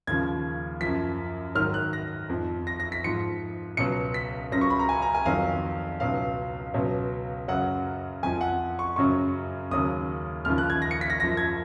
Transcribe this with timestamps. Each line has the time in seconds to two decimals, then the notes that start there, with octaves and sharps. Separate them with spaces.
0.07 D#2 C#3 F3 G#6
0.81 F#2 F3 B6
1.55 G#2 D#3 F#3 F6
1.74 F#6
1.93 A#6
2.29 F2 F3
2.67 A#6
2.80 A#6
2.92 B6
3.04 G#2 F3 C#7
3.77 C#2 B2 F#3 C#7
4.14 B6
4.52 C#2 C#3 F#3 A#6
4.61 C#6
4.70 B5
4.79 A#5
4.89 G#5
5.02 A#5
5.14 G#5
5.26 F2 D#3 F#3 F5
6.00 C#2 B2 F#3 F5
6.74 C#2 B2 F#3
7.48 F#2 C#3 F#3 F#5
8.23 F2 G#5
8.26 F3
8.41 F#5
8.79 C#6
8.96 F#2 C#3 F#3 C#6
9.71 D#2 C#3 F#3 D#6
10.45 D#2 C#3 F3 F6
10.58 F#6
10.70 G#6
10.82 A#6
10.91 C#7
11.01 B6
11.10 A#6
11.20 F#2 A#6
11.23 F3
11.37 G#6